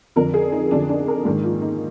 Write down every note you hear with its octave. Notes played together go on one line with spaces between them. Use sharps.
F2 D3 F3 A#4
G#4
D#4
F2 D3 F3 D4
D4
A#4
G#2 D#3 A#3
F4
D#4